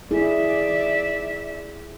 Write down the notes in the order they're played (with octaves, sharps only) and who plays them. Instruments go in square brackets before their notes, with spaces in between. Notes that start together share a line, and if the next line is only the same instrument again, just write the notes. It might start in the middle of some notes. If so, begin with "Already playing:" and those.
[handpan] E4 G#4 [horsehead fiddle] D5 E5